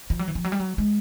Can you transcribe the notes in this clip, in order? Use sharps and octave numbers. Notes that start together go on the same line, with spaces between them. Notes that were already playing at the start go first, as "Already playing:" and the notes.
F3
F#3
E3
F3
F#3
G3
F#3
G#3